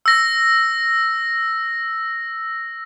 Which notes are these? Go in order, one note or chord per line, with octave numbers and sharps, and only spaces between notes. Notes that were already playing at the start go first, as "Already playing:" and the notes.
E6 A#6